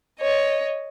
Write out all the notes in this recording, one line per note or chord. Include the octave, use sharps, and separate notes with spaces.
C#5 D#5